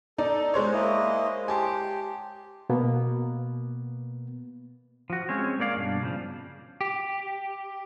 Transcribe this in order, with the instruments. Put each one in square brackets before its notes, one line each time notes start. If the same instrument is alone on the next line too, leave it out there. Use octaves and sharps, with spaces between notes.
[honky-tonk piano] D#4 [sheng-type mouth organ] A4 [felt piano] D5
[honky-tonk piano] G#3 C5 C#5
[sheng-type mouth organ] A#3 E4 D#5
[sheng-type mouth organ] G4 [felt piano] G#5 A5 C6
[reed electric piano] B2 A#3 B3
[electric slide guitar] F3 F#4
G#3 C4 C#4 G#4 C#5
A#3 C#5 D5 F5
G2 B2 D4
C#3 F3
[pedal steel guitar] G4